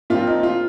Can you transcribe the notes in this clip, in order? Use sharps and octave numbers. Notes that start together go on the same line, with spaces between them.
A#2 F3 C4 F4
D#4
F4